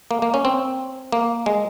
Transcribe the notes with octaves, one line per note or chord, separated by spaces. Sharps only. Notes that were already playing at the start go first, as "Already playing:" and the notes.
A#3
A#3
C#4
C4
A#3
G#3